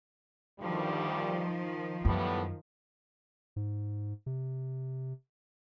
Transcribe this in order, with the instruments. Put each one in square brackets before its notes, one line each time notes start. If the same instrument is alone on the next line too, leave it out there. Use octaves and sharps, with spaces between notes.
[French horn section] D2 G2 G3 [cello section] D#3 F3
[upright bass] F#2 [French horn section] A2 G3 B3
[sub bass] G#2
C3